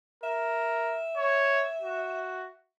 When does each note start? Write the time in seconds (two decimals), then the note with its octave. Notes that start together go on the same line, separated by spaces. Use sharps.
0.23 A#4 E5
1.17 C#5
1.82 F#4